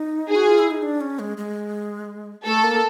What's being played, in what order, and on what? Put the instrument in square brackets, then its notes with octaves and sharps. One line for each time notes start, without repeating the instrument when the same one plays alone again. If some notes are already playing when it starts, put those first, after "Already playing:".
Already playing: [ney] D#4
[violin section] G#4
[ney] F#4
F4
E4
D#4
D4
C#4
G#3
G#3
[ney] A3 [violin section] A4
[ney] A#3